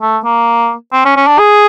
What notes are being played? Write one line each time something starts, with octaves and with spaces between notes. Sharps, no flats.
A3
A#3
C4
C#4
C#4
D4
G#4